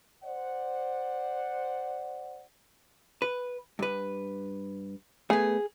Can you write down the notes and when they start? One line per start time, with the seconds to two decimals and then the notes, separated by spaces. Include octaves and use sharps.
0.24 C5 D5 F#5
3.22 B4
3.79 G2 B4
5.30 A3 B3 G#4